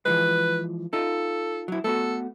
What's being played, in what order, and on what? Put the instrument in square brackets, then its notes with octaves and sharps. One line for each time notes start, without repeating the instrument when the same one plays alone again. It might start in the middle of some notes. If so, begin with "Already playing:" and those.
[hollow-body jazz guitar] E3 F3 G#3 [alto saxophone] B4
[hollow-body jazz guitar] D#4 F4 [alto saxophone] A4
[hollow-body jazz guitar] F#3 E4
[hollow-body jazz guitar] A3 B3 F#4 [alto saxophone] A4